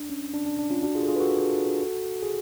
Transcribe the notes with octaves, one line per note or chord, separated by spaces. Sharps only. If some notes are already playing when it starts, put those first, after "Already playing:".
Already playing: D4
C#4
D4
D4
D4
C#4 F4
D4 F#4
F4 G#4
A4
F4 G#4
B4
F#4 A4
G#4